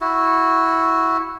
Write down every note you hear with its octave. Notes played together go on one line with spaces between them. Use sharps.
E4 F#4